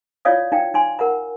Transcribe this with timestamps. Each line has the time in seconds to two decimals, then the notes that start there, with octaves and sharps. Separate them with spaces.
0.25 E4 F4 C#5 D5 F5 D#6
0.52 D#4 F5 G5
0.74 D#4 G#5 C6
0.99 A#4 F#5 A#5